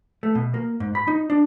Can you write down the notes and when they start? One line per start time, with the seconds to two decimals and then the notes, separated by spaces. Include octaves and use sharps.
0.23 A3
0.35 B2
0.54 A#3
0.80 G#2
0.95 B5
1.08 D#4
1.30 D4